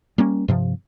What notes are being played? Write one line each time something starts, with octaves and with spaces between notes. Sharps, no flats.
G3 A#3 C#4
G2 C3 F3